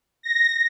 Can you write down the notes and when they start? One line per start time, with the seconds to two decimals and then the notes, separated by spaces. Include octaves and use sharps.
0.23 A#6